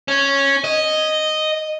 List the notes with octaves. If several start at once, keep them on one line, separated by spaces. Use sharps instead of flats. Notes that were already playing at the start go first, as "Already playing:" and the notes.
C#4
D#5